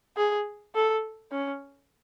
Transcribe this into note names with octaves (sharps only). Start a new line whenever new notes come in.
G#4
A4
C#4